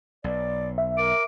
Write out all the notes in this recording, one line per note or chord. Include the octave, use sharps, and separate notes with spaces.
B1 D5
E5
A#4 D6